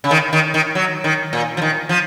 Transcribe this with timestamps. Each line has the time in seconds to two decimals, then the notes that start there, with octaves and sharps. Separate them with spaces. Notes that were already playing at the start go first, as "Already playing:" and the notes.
0.04 C#3
0.11 D#3
0.33 D#3
0.54 D#3
0.75 F#3
1.04 D#3
1.33 A#2
1.57 F3
1.62 D#3
1.89 F3